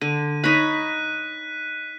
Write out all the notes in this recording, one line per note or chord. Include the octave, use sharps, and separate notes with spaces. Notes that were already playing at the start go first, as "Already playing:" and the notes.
D3 D#7
D#4 C#5 B5 F#6 B6 D#7